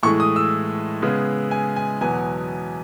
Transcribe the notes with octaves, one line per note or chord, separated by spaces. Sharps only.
A2 E3 G#3 C#6
D#6
E6
C#3 G#3 B3
G#5
G#5
E2 B2 F#3 B3 G#5